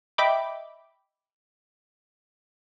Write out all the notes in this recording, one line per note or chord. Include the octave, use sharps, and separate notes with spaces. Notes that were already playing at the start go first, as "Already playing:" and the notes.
D#5 E5 G5 B5 D6